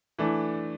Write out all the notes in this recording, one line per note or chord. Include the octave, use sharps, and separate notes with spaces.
E3 A3 D4